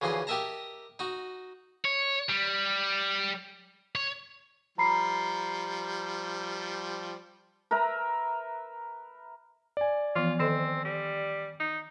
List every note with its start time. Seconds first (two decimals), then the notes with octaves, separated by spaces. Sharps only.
0.01 D2 C#3 E3 F3 D#5 C6
0.27 G4 A#4 D#5 E5 A5 A#5
0.99 D#4 F#4
1.85 C#5
2.30 G3
3.95 C#5
4.78 F3 G3 A#5 B5 C7
7.71 A#4 B4 E5 A#5
9.77 D5 G#5
10.15 E3 F3 B3 F4
10.39 D#3 C4 A4 D#5
10.85 G3
11.60 D#4